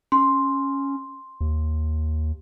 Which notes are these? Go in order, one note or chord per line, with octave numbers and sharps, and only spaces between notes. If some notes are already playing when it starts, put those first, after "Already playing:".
C#4 C6
D#2